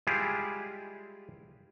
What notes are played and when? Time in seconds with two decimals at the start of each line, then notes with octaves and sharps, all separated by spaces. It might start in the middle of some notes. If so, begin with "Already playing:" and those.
0.07 G3 G#3 E4 F4 G4 G#4